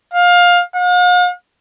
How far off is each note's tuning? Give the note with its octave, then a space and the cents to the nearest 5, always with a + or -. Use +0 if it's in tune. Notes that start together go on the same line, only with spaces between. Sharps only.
F5 +20
F5 +45